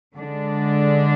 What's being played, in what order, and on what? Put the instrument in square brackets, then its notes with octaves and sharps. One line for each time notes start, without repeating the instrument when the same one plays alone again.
[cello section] D3 G#3 D4